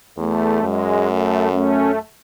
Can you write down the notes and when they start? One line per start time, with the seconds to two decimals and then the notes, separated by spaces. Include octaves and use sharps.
0.18 E2 A3
0.62 F#2 G#3
1.07 A3
1.52 A3 C#4